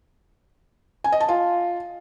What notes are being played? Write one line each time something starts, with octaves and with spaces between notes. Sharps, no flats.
G#5
D#5
A5
F4